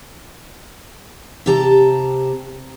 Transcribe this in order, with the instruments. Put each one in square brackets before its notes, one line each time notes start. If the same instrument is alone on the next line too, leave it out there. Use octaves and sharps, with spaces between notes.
[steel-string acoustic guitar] C3 G4 A5 A#5